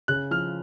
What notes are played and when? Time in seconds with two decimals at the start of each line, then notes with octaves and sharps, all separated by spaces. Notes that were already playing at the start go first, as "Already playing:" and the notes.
0.08 C#3 F#6
0.31 F3 F6